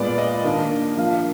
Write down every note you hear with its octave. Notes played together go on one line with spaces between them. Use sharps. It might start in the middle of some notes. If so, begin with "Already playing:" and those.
Already playing: A#2 G#3 B3 D5
D#5
D#3 A#3 D4
F3 A#3 D4 F5